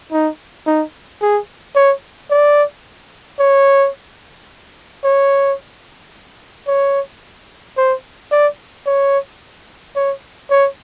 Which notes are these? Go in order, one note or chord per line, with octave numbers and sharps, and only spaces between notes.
D#4
D#4
G#4
C#5
D5
C#5
C#5
C#5
C5
D5
C#5
C#5
C#5